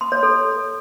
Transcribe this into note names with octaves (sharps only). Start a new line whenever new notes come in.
C6
C#5
A4